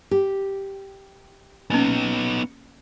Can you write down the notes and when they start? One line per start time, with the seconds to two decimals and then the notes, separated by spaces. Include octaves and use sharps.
0.11 G4
1.70 A#3 B3 C#4 D#4